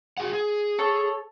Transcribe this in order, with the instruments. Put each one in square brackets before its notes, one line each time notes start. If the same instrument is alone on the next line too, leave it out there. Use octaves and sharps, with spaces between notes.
[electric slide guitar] F#4 G#4 F#5
G#4
[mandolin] A4 C#5